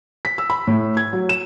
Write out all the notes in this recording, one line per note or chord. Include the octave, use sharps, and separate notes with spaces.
B6
E6
B5
A2
G#6
F#3
E7